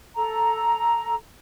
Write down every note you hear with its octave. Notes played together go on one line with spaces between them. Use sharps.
A4 A#5